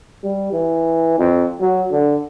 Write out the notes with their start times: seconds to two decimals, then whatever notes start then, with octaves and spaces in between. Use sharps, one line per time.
0.23 G3
0.52 E3
1.18 F2
1.61 F#3
1.91 D3